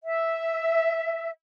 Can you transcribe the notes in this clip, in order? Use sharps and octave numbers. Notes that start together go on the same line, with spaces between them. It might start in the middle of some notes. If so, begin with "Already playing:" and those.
E5